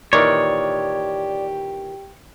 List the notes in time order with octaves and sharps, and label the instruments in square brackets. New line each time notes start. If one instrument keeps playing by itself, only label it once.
[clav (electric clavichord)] A#2 D#3 E3 [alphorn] G4 [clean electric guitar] C#5 [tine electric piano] D5